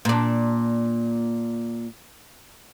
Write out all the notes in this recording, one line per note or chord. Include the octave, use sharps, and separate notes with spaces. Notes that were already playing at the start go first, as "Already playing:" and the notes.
A#2 D4